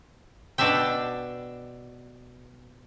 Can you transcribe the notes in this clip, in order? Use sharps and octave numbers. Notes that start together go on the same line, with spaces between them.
B2 D4 D5 E5 G5